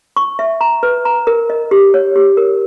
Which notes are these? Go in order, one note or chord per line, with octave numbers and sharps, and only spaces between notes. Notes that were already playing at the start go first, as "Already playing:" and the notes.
C#6
E5
A#5
B4
A#5
A#4
D#5
G4
C#5
G4
A#4